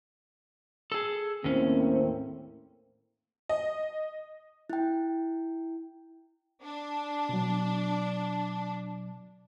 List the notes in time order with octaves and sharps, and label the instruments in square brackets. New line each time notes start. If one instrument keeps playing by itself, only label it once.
[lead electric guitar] G#4 A4
[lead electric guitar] D#2 C#4 [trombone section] A2 A#3 C4
[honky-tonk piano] D#5
[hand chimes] E4 G5
[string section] D4
[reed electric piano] B2 F#3